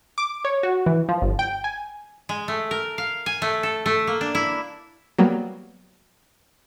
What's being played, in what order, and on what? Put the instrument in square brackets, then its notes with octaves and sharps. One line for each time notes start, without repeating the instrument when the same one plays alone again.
[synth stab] D6
C#5
F#4
E3
F3
G1
G5
G#5
[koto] G#3
A3
A#4
F5
G#5
A3
A4
A3
A#3
D4
E4
[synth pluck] F#3 G3 A#3 B3